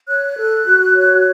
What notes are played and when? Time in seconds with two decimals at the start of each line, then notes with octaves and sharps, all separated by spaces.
0.07 C#5 F#6
0.36 A4
0.65 F#4
0.95 C#5